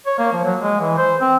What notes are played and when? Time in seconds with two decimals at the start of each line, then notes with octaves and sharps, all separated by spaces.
0.06 C#5
0.18 A#3
0.33 F3
0.45 F#3
0.61 G#3
0.81 E3
0.98 C5
1.21 C4